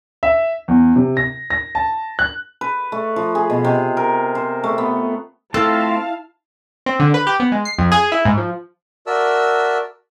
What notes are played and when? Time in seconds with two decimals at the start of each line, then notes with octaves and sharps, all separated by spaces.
0.23 E5
0.68 E2
0.96 C3
1.17 A#6
1.50 A#6
1.75 A5
2.19 F#6
2.61 B4
2.92 A3
3.16 F3
3.35 G#4
3.50 B2
3.64 C3
3.97 A#4
4.35 C5
4.64 A3
4.78 B3
5.54 A3 C4 E4 F4 A4 F5 A5
6.86 C4
7.00 D3
7.14 B4
7.27 G4
7.40 B3
7.52 G#3
7.65 C7
7.79 F2
7.92 G#4
8.12 E4
8.25 G#2
8.38 F3
9.07 F#4 A#4 D5 E5 A5 E6